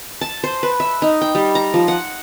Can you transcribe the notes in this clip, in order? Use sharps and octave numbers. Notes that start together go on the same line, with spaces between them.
A5
C5
B4
E5
D#4
G5
G3
A#5
F3
F#5